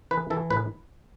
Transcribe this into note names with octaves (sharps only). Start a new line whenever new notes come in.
E3 B4
E3 A4
A2 B4